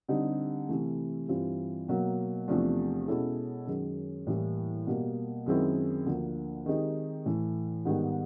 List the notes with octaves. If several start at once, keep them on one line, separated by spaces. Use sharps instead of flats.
D3 G3 C4 D#4 G4
C3 E3 A3
G2 E3 G3 C4 F4
B2 F#3 A#3
E2 C3 F3 A3 D4
B2 G#3 C#4 E4 A4
F#2 D#3 G#3 C#4
A2 E3 G3 A#3
B2 G3 A#3
F#2 D#3 G#3 C4 E4
D2 D3 F3 A#3
D#3 G#3 C4 D#4 G4
A2 E3 A3
G#2 D#3 G3 B3